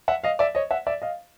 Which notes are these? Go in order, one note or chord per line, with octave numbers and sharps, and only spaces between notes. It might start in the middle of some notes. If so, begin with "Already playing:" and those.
E5 F#5
D#5 F5
D5 E5
C#5 D#5
E5 F#5
D5 E5
D#5 F5